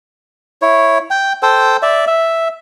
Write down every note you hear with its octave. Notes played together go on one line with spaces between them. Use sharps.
E4 C#5
G5
A4 C5 G5
D5 E5
E5